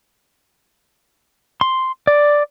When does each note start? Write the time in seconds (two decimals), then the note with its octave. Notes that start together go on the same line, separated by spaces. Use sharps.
1.61 C6
2.07 D5